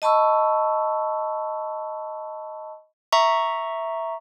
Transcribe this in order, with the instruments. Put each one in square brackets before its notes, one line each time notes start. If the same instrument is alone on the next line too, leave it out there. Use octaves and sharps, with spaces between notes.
[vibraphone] D#5 A5 B5 C#6 E6
[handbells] E5 A#5 C#6